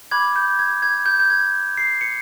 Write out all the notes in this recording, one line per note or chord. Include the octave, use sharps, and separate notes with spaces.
B5 D6 F#6 G#6
G6
G#6
G#6
G6
G6
G#6
C7
C#7